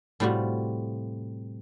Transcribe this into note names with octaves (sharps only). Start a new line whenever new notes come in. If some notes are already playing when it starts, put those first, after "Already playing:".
A2 C3 G3 F4 F#4